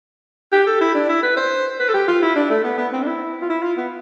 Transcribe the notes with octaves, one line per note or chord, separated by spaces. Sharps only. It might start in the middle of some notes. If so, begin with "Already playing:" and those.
G4
A4
E4
D4
E4
B4
C5
B4
A4
G4
F4
E4
D4
A3
B3
B3
C4
D4
E4
F4
E4
F4
B3